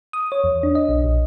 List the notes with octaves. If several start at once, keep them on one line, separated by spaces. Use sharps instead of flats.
D#6
C#5
E2
D4
D#5
B1
A#1